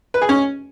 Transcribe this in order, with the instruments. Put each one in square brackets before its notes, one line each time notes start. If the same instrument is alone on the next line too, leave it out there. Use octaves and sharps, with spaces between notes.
[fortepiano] B4
G#4
C#4